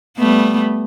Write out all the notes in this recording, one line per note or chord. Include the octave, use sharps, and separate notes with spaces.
G3 A3 B3